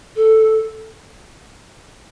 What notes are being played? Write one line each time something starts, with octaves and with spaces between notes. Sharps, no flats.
A4